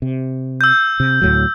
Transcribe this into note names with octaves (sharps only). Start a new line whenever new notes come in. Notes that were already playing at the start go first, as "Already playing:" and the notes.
C3
E6 G6
C3
D2 A2 F#3